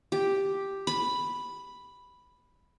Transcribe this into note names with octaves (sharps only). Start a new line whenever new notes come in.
G4
B5